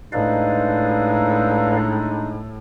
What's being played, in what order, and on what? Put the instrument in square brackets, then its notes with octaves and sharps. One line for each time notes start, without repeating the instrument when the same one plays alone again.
[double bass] A2 [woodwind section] G#3 D4 D#4 [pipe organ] B4 D5 F5